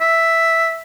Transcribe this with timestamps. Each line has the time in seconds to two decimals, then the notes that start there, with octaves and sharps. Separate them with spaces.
0.01 E5